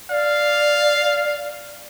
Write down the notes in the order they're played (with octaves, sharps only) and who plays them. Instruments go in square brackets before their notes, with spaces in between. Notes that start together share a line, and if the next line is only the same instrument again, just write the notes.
[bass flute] D5 [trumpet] F5